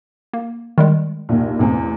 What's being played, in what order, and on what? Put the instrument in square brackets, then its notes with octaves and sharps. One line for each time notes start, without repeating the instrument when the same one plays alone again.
[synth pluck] A#3
D#3 G3 G#3
[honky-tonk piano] A#1 D#2
A1 E2 C4